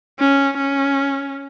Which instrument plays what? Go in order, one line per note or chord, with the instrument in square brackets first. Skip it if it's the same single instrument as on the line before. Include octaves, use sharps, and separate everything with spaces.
[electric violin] C#4
C#4